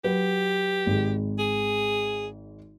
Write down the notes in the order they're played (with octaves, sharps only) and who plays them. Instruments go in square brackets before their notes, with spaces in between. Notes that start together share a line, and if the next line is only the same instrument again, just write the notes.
[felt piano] F#3 B4 [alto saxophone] G4
[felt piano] G#1 G#3
[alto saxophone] G#4